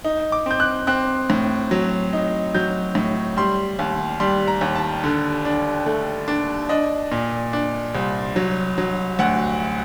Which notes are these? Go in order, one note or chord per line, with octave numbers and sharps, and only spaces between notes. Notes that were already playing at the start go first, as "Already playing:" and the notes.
D#4
D6
C4 G6
F#6
C4 F#6
A2
F#3
D#4
F#3 G6
A2
G3 C6
D#2
G3 C6
A#5
D#2
A5
D3
D4
A3
D4
D4 D#5
A#2
D4
C2
F#3
F#3
D2 F#5